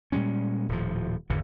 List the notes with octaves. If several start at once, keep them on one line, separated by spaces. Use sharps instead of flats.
A#2 G3 G#3 C#4
D#1 A2 F3
G#1 E2 D3 E3